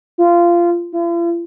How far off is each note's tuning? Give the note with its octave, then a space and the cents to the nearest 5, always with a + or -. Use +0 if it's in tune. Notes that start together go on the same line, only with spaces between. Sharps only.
F4 -20
F4 -45